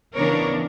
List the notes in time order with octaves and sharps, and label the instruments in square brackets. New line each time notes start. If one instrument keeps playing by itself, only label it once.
[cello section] C#3 E3 B3 D4 A#4 C#5